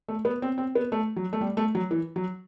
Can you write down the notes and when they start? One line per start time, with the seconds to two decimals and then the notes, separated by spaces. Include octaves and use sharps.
0.08 A3
0.25 B3
0.42 C4
0.58 C4
0.75 B3
0.92 A3
1.16 F#3
1.33 A3
1.41 G3
1.57 A3
1.75 F#3
1.91 E3
2.16 F#3